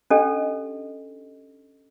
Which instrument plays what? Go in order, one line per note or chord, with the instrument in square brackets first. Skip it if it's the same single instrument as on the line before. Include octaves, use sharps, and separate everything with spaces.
[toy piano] C#4 D4 G4 A4 D#5